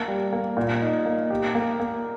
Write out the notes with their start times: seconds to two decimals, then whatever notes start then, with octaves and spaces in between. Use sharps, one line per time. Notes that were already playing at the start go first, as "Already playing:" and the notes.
Already playing: A#3
0.08 G3
0.33 A#3
0.57 A#2
0.82 D#4
1.06 A#3
1.30 G4
1.55 A#3
1.80 A#3